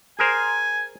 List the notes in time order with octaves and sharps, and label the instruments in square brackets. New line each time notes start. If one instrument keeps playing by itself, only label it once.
[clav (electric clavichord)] G#4 A#4 C5 [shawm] G#5